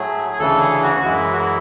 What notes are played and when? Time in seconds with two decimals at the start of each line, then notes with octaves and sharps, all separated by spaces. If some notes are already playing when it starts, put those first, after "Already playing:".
Already playing: A2 F#3 A3 G#4
0.33 G#4
0.39 D2 C#3 E3 A4
0.61 G#4
0.83 F#4
1.05 F#2 E3 G#3 E4
1.33 F#4
1.38 E4